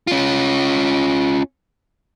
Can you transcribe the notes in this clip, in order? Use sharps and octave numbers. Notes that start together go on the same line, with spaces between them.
C#4 F4